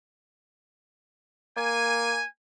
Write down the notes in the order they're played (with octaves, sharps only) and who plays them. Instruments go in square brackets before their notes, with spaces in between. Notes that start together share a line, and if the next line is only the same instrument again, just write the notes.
[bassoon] A#3 [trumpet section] G#5